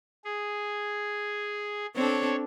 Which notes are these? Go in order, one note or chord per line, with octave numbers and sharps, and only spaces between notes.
G#4
C4 D4 A4 C#5